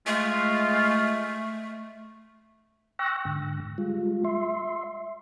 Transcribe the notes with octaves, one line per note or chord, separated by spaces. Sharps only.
G#3 A3 F4
G5 C#6 E6 F#6 A#6
G#2 D3
G3 G#3 F4
E5 C6